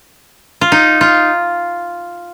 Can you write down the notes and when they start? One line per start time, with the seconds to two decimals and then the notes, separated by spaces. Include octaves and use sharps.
0.61 F4
0.72 D#4
1.01 F4